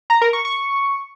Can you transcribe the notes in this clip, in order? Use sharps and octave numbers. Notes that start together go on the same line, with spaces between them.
A#5
A#4
C#6
C#6